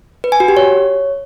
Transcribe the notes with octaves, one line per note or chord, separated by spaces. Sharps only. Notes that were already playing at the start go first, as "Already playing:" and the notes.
B4
G#5
F#4
G4
C#5